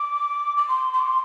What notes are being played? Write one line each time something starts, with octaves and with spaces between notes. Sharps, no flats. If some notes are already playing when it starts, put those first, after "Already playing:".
Already playing: D6
D6
C6
C6
D6
C6